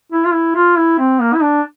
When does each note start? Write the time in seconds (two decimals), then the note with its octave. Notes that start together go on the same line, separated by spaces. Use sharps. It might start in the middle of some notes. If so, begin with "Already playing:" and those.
0.12 E4
0.25 F4
0.33 E4
0.56 F4
0.77 E4
0.99 C4
1.21 A#3
1.34 E4
1.42 D4